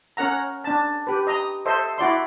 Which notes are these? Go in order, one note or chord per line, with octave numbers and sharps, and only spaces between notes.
C#4 A#4 F#5 A#5
D4 A5
G4 B4
D#5 A#5 D#6
A4 C5 D#5 E5
E4 F#4 D5 C6